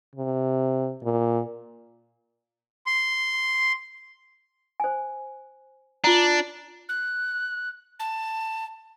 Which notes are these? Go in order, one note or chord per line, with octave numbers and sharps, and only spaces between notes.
C3
A#2
C6
C5 G#5
D4 F4 A#5
F#6
A5